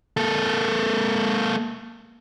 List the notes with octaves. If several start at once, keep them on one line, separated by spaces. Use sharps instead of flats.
A#3 A4